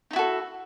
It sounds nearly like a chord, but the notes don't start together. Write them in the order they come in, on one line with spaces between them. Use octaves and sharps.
D#4 E4 F#4 A4